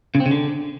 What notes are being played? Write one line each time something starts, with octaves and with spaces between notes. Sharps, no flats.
C#3
C4
C#3
D3